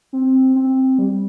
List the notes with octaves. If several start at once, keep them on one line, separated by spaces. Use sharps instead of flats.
C4
C4
G3